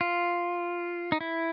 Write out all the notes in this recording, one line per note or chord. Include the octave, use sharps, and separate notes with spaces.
F4
D#4
E4